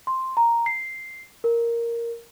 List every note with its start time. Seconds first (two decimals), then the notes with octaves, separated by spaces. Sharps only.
0.07 C6
0.37 A#5
0.66 C7
1.44 A#4